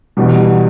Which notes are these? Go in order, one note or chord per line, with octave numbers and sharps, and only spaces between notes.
E2 B2 G3